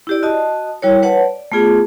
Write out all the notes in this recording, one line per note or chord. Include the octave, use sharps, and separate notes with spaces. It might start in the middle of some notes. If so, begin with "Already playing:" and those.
E4 G4 D5
F#4 D#5 A5 D#6
G3 E4 F#4 A#4 C#5
B4 C#5 F#5 A5
D5
A3 B3 F4 G#4